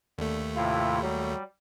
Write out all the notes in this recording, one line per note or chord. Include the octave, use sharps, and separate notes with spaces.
D#2 D3 A3
A2 C3 E4 F4
F#3 G3